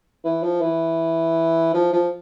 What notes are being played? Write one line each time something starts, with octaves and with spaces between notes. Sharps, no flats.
E3
F3
E3
F3
F3